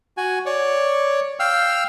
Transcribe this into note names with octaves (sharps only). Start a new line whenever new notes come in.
F#4 G#5
C#5 D5
F5 G5 E6 F6